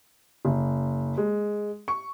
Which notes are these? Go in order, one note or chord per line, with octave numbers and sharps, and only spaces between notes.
F#1
G#3
C#6